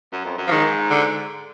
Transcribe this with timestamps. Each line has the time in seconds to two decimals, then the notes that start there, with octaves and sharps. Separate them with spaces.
0.12 F#2
0.25 F2
0.38 F#2
0.47 F3
0.51 G#2 D#3
0.91 D3